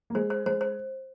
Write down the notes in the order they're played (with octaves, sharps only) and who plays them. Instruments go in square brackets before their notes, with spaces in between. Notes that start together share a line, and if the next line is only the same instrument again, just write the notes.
[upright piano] A#3
[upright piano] G#3 [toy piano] C5
[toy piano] C5
[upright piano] G#3 [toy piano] C5
[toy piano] C5